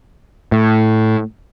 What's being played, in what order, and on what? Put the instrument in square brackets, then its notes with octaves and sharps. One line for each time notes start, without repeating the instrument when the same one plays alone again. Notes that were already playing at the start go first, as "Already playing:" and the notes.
[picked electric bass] A2